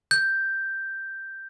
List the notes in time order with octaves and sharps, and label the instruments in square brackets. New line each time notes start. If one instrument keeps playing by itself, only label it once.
[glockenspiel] G6